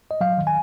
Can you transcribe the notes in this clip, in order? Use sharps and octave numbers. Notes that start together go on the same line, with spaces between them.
D#5
F#3 F5
D#3
G#5